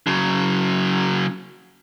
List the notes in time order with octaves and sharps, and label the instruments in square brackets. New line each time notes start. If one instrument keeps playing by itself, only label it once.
[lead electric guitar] C#3 F#3